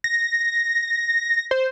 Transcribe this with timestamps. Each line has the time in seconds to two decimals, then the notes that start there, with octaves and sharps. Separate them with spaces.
0.04 A#6
1.51 C5